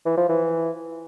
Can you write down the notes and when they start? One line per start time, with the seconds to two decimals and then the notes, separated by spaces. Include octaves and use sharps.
0.05 E3
0.17 F3
0.29 E3